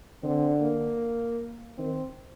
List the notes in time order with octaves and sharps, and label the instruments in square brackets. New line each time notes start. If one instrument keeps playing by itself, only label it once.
[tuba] D3 [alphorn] C4
[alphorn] A#3
[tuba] D#3 [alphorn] C4